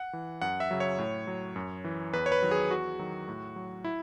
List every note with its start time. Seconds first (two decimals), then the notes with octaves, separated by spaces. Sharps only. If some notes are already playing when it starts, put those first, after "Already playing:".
Already playing: F#5
0.13 E3
0.41 F#2 F#5
0.60 E5
0.71 C#3 F#3
0.80 C#5
0.98 A2
1.27 F#3
1.56 F#2
1.84 E3
2.13 E2 B4
2.26 C#5
2.32 B4
2.42 D#3 F#3
2.51 G#4
2.70 E2 F#4
2.99 D#3 F#3
3.28 A2
3.56 F#3
3.84 E4